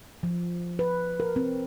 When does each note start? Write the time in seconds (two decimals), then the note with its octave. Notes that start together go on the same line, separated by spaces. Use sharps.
0.23 F3
0.79 B4
1.20 A#4
1.36 C4